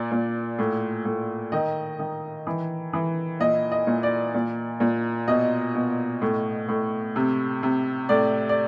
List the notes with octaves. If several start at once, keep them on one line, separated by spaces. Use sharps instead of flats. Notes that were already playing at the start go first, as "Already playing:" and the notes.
Already playing: A#2 D5
A#2
A2
A2
D#3 D#5
D#3
E3
E3
A#2 D#5
D#5
A#2
D5
A#2
A#2
B2 D#5
B2
A2
A2
C3
C3
A2 D5
D5